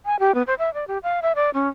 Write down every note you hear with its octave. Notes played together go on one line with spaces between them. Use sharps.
G#5
G4
B3
C5
E5
D5
G4
F5
E5
D5
C#4